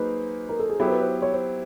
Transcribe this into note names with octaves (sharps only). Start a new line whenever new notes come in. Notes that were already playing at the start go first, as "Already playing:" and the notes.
Already playing: F#3 A#3 D#4 G#4 B4 C5
A#4
A4
G#4
F#3 B3 E4 G4 A4
C5
B4
C5
C#5
C5